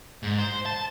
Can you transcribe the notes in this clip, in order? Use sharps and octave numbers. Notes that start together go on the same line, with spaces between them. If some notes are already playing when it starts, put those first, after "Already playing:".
G#2
C5
A5